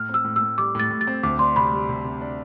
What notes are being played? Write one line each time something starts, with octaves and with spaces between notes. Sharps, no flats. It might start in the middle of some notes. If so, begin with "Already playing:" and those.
Already playing: A2 F6
C4
E6
A2
E6
A2
G3 D6
A2 A6
A2
A6
C4
D2 D6
D4 C6
C3 B5
G3
C3
C3
D4